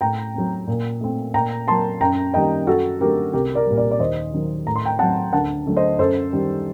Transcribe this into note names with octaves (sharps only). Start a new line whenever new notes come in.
A2 G5 A#5
F#3 C4
A#2
A3 C4
A#2 G5 A#5
F#3 A#3 A5 C6
F#2 G5 A#5
D#3 G3 A#3 D#5 G5
F#2 F#4 A4
D3 F#3 A3 C4 G4 A#4
C2 G4 A#4
A#4 D5
A#2 G3
A#4 D5
D5
D#2 C5 D#5
D#3 F#3
A2 A#5
C6
G5 A#5
F#3 C4 F#5 A5
D2 F#5 A5
D3 F#3 A3
C5 D#5
F#2 A4 C5
D#3 G3